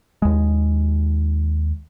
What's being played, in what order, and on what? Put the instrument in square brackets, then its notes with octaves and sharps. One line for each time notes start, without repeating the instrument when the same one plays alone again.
[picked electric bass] D#2 G#3